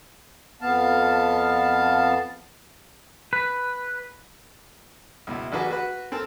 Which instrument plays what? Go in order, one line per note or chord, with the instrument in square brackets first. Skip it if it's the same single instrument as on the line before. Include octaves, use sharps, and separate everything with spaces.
[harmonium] F2 B3 F5 A5
[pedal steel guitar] B4
[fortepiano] C#2 B2 E4
A1 D4 F#4 G#4 B4 A5
F#4 B4
C4 A4 A#4 A5